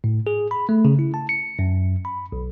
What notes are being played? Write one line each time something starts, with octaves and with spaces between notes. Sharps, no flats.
A2
G#4
B5
A3
C#3
E4
A5
C#7
F#2
B5
B1